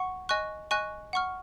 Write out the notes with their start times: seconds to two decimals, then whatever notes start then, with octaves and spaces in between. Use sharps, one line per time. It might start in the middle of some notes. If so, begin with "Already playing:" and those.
Already playing: F#5 C#6
0.29 D#5 G#5 C#6 F#6
0.71 D#5 G#5 C#6 F#6
1.13 F#5 C#6 F6